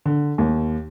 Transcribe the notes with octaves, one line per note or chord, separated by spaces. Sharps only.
D3
D#2